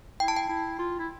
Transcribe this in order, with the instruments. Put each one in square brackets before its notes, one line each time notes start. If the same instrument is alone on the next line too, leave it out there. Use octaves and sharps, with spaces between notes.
[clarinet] E4 [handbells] G5
[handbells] A5
G5
[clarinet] E4
F4
E4